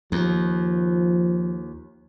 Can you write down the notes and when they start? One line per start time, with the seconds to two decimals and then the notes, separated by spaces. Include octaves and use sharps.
0.12 D#2 F3